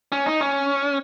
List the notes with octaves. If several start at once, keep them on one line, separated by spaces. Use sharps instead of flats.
C#4
D#4
C#4